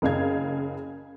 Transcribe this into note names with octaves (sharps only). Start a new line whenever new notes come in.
F#1 C#3 F5 G#6